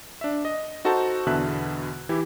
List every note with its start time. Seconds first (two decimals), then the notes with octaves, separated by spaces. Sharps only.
0.21 D4 E5
0.45 D#5
0.85 D#4 F#4 A4 C5 A5
1.26 E2 B2 D3 E5 A5 F#6
2.09 E3 E4 G4